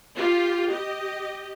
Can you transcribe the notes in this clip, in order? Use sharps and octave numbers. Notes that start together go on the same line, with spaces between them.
F4 G4
G4 D#5